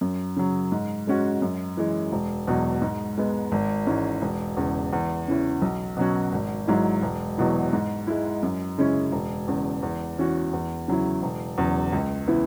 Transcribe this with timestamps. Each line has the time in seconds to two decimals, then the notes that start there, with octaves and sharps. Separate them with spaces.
0.01 F#2
0.36 C#3 F#3
0.72 G#2
1.07 G#3 C#4 F#4
1.42 F#2
1.77 E3 G#3
2.12 E1
2.48 E2 B2 F#3
2.82 G#2
3.18 G#3 B3
3.52 G#1
3.87 G#2 E3 C#4
4.22 E1
4.57 E2 C#3
4.93 E2
5.28 C#3 E3 C#4 E4
5.62 B1
5.97 B2 F#3 C#4 F#4
6.32 G#1
6.67 G#2 F#3 E4
7.02 E1
7.38 E2 B2 F#3 E4
7.73 G#2
8.07 G#3 E4
8.43 F#2
8.78 C#3 G#3 C#4 E4
9.12 E1
9.48 E2 C#3
9.83 E2
10.18 E3 C#4 F#4
10.53 E2
10.88 C#3 F#3 E4
11.23 E1
11.58 E2 C#3 F#3
11.92 C#2
12.28 C#3 E3 B3 E4